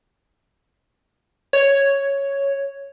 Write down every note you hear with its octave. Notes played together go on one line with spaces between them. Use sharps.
C#5